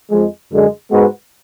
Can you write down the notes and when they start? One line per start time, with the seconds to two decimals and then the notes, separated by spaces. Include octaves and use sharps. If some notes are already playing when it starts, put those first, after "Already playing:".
0.11 F2 F3 G#3
0.52 F#2 D3 G#3
0.91 G#2 G#3 B3 F#4 B4